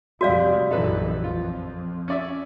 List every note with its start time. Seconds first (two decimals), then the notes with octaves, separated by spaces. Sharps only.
0.21 F1 G3 G#3 F#4 D5 E5 F5
0.71 A#1 F#2 E3 D#4 A4 B4
1.24 F2 F4
2.08 C#4 D5 E5